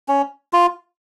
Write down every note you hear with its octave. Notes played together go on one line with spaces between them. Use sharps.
C#4
F4